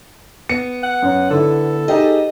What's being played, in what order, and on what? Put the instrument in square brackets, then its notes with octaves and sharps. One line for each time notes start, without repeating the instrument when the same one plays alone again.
[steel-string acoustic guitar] B3 [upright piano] C#7
[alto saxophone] F#5
[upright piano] F#2
[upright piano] D3 E4 [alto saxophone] A4
[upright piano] D#4 G4 G#4 [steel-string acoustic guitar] D#5